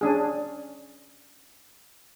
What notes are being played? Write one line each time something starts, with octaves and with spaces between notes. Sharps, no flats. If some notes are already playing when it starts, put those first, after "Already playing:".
C#4 D4 G#4